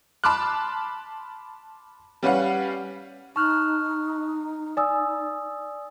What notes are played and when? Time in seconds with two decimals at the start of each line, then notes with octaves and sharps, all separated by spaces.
0.24 A5 B5 C6 D6 F6 F#6
2.23 G3 C#4 B4 F5 F#5
3.36 D#4 A5 C#6 F6 F#6
4.77 D5 G#5 D#6 E6